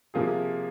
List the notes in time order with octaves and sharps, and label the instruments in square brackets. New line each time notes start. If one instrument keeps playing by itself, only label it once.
[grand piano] C3 F3 A#3 F4 G#4